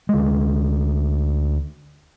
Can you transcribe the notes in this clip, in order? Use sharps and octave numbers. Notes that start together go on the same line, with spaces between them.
D2 G#3